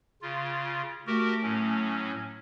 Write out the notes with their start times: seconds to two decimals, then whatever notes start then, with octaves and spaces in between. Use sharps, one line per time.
0.22 C#3 F4
1.07 A3 F#4 G4 A#4
1.43 A2 F#3 C#4